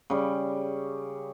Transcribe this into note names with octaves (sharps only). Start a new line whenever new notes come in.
C#3 G3